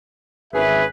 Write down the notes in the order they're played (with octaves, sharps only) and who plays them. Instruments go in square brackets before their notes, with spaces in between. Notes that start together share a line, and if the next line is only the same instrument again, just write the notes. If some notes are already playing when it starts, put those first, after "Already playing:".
[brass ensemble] G#1 E5 [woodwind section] C#4 G#4 B4